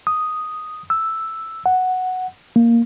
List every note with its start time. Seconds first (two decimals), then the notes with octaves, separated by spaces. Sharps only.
0.07 D#6
0.90 E6
1.66 F#5
2.56 A#3